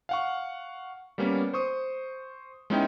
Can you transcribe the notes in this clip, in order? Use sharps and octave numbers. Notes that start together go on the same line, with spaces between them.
F5 F#5 C#6
G3 A#3 B3 C#4
C5 C#6 D#6
G#3 B3 C#4 D#4 E4 G5